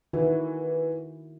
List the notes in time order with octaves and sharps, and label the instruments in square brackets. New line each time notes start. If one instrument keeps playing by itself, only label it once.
[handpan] D#3 E4 F#4 [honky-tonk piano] E3